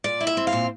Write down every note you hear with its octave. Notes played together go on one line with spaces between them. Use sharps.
A#2 D5
E4
E5
C4
F5
A#2